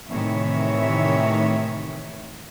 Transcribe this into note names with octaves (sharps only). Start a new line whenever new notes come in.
A2 C3 D#3 E3 C#5 E5